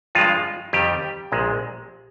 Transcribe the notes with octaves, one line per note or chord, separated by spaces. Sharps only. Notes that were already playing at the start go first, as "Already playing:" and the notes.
G2 F3 G#3 F4
F2 D#3 G3 G4
A#1 A#2 G#3